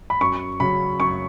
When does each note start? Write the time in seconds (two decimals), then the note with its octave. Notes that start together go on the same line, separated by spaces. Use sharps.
0.10 B5
0.21 F#2 C#6
0.60 C#3 F#3 C#4 B5
1.00 F#2 C#6